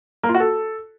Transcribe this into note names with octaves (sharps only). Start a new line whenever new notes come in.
A#3
F4
F#4
A4